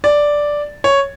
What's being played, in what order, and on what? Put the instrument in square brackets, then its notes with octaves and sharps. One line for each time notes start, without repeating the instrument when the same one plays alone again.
[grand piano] D5
C#5